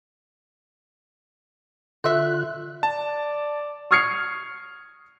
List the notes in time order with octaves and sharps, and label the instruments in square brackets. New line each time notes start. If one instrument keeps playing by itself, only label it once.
[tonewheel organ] D3 F4 F#6 [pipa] F#4 E5
[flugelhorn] D5 [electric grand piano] A5
[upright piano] C#6 D#6 F6 G#6 C7 C#7